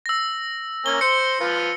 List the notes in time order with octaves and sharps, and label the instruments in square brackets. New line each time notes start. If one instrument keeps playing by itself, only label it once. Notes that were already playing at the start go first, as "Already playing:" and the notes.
[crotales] E6 A#6
[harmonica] A#3 C#4 [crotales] G7
[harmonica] C5 C6 [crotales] C#7
[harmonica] F3 F4 B4